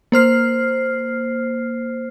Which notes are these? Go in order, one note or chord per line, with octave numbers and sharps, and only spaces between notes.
A#3 C5 F6 C7